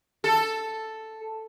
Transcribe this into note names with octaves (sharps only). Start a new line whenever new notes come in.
A4